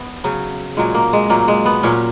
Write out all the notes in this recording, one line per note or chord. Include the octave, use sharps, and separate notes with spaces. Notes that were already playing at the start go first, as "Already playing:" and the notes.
Already playing: B3
C#3 F#3
A#2 F#3 G#3
A#3
G#3
A#2 F#3 A#3
G#3
B3
A#2 F#3 C#4